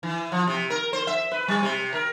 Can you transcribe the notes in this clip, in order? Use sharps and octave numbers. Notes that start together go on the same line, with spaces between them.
E3
F3
C3
A#4
C5
E5
B4
G3
C3
A#4